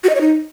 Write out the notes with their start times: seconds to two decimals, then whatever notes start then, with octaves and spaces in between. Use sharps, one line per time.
0.04 F#4
0.09 D#5
0.15 C#5
0.21 D#4